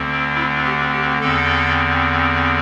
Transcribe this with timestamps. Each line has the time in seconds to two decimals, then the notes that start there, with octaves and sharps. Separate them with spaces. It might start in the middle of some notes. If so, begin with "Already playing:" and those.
Already playing: D2 D3 C4
0.35 E4
0.64 G4
0.92 G4
1.21 E2 D3 C4 A4